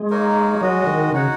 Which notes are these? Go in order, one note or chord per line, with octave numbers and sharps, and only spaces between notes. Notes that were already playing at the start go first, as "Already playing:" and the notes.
Already playing: G#3
A#3 D#4 A#4 C#5
F#3 G#3 F#4 D#5
D#3
C#3 D#4 F#4 C#5 F#5